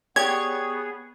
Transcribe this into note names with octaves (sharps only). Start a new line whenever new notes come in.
B3 G4 G#4 C#5 D5 G5 G#6